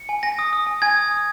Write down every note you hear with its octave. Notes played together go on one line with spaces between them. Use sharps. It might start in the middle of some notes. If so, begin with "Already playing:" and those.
Already playing: C#7
G#5
G#5 A#6
D#6
D#6
G#5
G#5 G#6
D#6
D#6